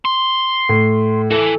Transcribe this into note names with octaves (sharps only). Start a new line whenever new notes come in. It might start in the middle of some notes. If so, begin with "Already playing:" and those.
C6
A2
E3 A4